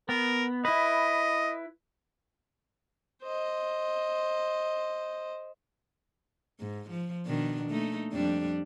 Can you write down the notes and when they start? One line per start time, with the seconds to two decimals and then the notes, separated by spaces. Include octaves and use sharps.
0.09 B3 A#4
0.65 E4 B4 D#5
3.22 C5 D#5
6.59 G#2
6.90 F3
7.26 B2 D#3 D4
7.70 A3 A#3 D#4
8.12 F2 G3 D4